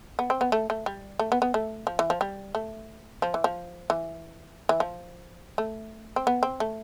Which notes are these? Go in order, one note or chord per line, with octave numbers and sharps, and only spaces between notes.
B3
C4
B3
A3
A3
G3
A3
B3
B3
A3
F3
E3
F3
G3
A3
F3
E3
F3
E3
E3
F3
A3
C4
B3
C4
A3